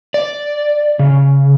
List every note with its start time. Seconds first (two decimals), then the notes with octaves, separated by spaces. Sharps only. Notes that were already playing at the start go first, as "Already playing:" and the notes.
0.14 D5
0.99 C#3